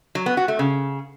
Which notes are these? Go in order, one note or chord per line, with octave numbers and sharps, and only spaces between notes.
F#3
B3
F#4
A3
C#3